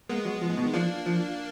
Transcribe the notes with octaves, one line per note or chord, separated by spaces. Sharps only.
G#3 A#3 B3
F#3
F3
G#2
B2
D#3
F3 A#3 D4
F3